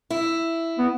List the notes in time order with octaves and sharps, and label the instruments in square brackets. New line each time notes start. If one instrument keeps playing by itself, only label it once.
[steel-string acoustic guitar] E4
[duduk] B3